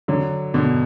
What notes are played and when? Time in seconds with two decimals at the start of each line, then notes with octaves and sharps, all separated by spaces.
0.08 D3 F#3
0.54 B2 D3